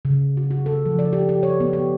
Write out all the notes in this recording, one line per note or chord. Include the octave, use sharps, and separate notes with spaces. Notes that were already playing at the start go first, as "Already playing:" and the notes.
C#3
F#4
F#4
A4
F3
D5
G4
G4
C#5
B3
G4